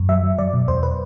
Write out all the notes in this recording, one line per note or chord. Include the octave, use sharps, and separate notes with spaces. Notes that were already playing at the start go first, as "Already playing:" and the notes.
Already playing: F#2
F#3 E5
F#3
F#3 D5
B2
E2 C5
B4